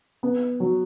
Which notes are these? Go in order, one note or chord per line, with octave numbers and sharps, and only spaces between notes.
B3
F#3